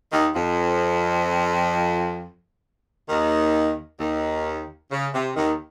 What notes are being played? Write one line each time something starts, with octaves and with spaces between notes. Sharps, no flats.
D#2 D#3
F2 F3
D#2 D#3
D#2 D#3
C#3
C3
D#2 D#3